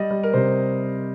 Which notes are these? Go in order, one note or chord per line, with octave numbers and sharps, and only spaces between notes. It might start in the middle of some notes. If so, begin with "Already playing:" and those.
Already playing: G3 D#5
G3
A#4
C3 C5